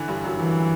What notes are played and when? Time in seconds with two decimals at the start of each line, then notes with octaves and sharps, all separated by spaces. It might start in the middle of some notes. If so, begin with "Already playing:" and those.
Already playing: D3 E3
0.08 G2 G3
0.24 F#2 F#3
0.39 F#2 E3 F#3